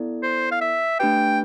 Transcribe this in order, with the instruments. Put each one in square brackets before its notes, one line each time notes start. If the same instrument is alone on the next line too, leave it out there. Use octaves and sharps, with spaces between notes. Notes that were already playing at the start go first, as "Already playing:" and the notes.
Already playing: [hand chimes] B3 E4 A4 D5
[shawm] C5
F5
E5
[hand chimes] A3 D4 G4 B4 [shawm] G5